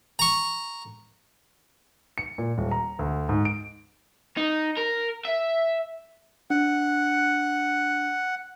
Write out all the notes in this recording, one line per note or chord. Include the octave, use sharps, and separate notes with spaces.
A#5 C#6
C#7
A#2
D#1
A#5
D2
G#2
D7
D#4
A#4
E5
D4 F#5